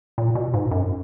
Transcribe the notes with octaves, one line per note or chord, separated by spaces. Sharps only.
A#2
B2
G#2
F#2